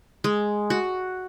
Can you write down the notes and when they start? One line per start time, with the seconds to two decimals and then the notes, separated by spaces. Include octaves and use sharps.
0.24 G#3
0.70 F#4